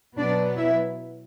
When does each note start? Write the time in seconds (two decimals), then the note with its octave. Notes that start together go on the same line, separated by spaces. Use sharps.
0.17 B2 F#3 B3 D4 D5
0.57 E4 E5